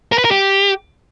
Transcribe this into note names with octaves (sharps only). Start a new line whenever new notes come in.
A#4
B4
A#4
G4